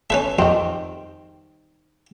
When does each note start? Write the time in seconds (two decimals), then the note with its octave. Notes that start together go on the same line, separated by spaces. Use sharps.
0.10 C#4 A4 B4 E5
0.39 F2 D#3 G3 C4